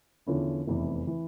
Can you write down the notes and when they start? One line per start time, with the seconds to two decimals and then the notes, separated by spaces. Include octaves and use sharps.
0.27 E2 D3 F3 C#4 E4
0.67 F1 E2 E3
1.07 E3